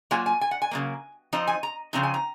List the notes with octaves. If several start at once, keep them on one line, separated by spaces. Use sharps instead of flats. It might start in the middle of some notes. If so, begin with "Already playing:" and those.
F#3 A#3 F4 G#5
G#5
G#5
F#5
G#5
C#3 F#3 A#3
F3 C4 D#4 A#5
G#5
A#5
C#3 F3 C4 D#4 A#5
G#5
A#5